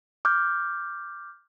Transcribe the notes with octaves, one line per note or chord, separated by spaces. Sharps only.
D6 F6 G6